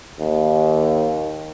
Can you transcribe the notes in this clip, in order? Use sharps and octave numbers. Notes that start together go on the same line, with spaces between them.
D#2